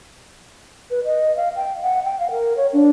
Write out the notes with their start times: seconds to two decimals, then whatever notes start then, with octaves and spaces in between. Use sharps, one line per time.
0.91 B4
1.04 D#5
1.37 F5
1.56 G5
1.82 F#5
2.04 G5
2.19 F5
2.31 A#4
2.57 C#5
2.73 D4